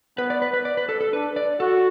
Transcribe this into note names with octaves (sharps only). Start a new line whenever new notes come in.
B3 B4
D5
B4
B4
D5
B4
A4
A4
D4 B4
D5
F#4 A4